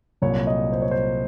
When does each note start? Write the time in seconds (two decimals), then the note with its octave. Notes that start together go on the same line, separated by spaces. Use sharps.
0.22 C2 A#2 F#3 C#5
0.47 D#5
0.72 C5
0.82 C#5
0.91 C5